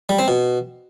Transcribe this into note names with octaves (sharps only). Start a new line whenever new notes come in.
G3
C4
B2